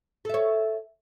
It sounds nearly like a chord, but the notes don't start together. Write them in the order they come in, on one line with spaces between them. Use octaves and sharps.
A4 E5 C#5